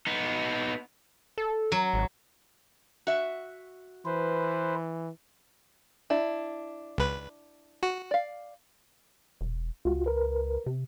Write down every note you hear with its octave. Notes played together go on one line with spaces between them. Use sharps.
B3 D#4
A4
F#3
G#1
F#4 E5
E3 B4 C5
D4 E4
C#2 B4
F#4
D5 F5
E1
C#2 F4 F#4
A#4 B4
C3